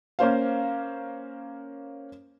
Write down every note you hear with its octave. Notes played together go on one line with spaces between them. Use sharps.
A#3 C#4 C5 F5